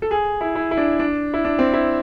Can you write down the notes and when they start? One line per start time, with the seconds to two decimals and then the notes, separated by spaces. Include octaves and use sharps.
0.02 A4
0.11 G#4
0.41 E4
0.55 E4
0.71 E4
0.77 D4
0.99 D4
1.34 E4
1.45 D4
1.59 C4
1.74 E4